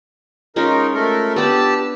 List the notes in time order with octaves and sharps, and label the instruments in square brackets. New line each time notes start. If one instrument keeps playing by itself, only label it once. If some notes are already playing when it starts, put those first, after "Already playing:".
[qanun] G#3 C#4 F4 [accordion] D#4 A#4
[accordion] A3 A4 A#4
[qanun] B3 D4 [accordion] G4 A5 E6